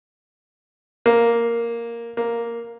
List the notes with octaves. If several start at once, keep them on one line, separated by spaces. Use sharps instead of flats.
A#3
A#3